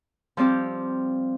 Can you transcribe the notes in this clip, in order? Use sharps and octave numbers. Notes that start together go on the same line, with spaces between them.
F3 G3 C4 G4